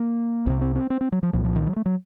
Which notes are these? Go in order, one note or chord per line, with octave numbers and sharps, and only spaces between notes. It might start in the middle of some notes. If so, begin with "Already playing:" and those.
Already playing: A#3
C2 C3 C4
C4
C4
C4
C4
F#3
F3
C2 A#2 F3
F3
D#3
F#3
A3
F#3